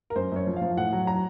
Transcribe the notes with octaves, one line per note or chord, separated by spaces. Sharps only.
A#4
F#2 C5
F#2 C#5
F3
F5
F3
A2 F#5
F#3
F#3 A#5